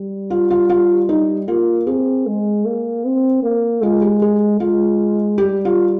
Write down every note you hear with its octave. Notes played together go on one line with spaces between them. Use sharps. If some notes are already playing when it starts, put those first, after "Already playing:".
Already playing: G3
F4
F4
F4
D#4
A#3 F4
C4 G#4
G#3
A#3
C4
A#3
G#3 F4
G4
G#4
G#3 F4
G3 G4
F4